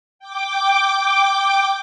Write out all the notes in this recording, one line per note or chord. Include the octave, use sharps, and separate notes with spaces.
G5 D6